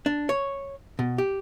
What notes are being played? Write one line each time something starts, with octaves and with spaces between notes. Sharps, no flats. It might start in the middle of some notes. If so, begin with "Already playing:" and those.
D4
C#5
B2
G4